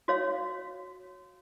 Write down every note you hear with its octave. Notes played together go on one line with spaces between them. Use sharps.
F#4 C#5 F5